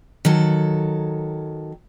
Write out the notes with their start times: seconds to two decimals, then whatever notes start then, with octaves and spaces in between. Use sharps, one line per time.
0.25 D#3 F#3 A4